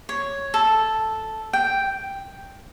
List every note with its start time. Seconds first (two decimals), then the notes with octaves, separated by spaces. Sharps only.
0.09 C#5
0.54 A4
1.53 G5